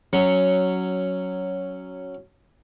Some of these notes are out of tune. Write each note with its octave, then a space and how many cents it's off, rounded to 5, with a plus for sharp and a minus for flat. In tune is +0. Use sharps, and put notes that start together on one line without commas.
F#3 +0 C#4 +0